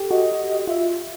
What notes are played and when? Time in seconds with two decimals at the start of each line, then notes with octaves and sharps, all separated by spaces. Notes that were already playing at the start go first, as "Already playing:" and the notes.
Already playing: G4 A4
0.11 F#4 D#5
0.67 F4 E5